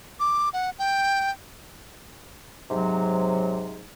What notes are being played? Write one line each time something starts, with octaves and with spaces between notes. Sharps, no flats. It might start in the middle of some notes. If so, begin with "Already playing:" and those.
D6
F#5
G5
G#2 C3 F#3